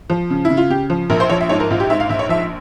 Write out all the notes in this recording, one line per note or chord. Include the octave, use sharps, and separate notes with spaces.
F3
C#3
E4
C#3
F4
C#3 G4
F3
A#1 A#4
C5
F3 C#5
E5
G#2 C#5
A#4
A#1 F4
G4
G#2 E5
F5
A#1 E5
C#5
F3 E5